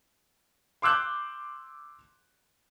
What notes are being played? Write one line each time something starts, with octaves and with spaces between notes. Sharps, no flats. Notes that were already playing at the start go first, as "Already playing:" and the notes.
C6 D6 E6 F#6 G6